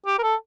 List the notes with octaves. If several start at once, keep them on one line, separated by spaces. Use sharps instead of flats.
G4
A#4
A4